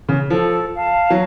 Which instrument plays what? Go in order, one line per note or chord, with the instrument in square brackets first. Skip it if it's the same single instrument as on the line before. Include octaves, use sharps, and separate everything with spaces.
[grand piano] C#3
[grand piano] F3 [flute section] A4
[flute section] F5 A5
[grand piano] F#3